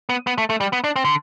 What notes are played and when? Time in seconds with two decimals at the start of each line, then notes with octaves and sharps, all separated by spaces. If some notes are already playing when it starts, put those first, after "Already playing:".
0.09 B3
0.27 B3
0.38 A3
0.50 A3
0.61 G3
0.73 B3
0.84 D4
0.96 C4
1.05 D3